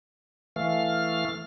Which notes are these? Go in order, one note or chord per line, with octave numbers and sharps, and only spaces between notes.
E3 A3 F5 F6